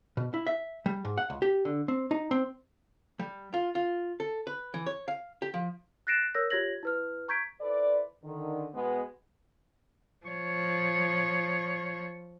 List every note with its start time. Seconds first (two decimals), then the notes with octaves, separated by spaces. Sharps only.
0.17 B2
0.34 E4
0.47 E5
0.86 G3
1.05 G#2
1.18 F#5
1.30 C#2
1.42 G4
1.65 D3
1.88 C4
2.11 D#4
2.31 C4
3.19 G3
3.54 F4
3.75 F4
4.20 A4
4.47 B4
4.74 E3
4.86 C#5
5.08 F5
5.42 G4
5.54 F3
6.07 F#6 A6 A#6 C7 D7 E7
6.35 A#4 C#5 E6 G6 A#6
6.50 F4 G4 C#5 G#6 A#6 F#7
6.83 E4 B4 F6
7.28 A#5 C#6 G6 G#6 B6 D7
7.61 E4 A4 B4 C5 D5
8.24 D3 D#3
8.74 B2 G#3 B3
10.26 F3 C#5